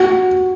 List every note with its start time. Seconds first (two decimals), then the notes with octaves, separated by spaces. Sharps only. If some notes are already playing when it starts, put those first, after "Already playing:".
Already playing: F#4